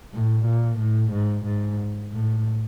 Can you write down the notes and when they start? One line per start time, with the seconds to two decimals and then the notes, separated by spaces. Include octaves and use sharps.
0.14 A2
0.46 A#2
0.79 A2
1.12 G#2
1.45 G#2
2.12 A2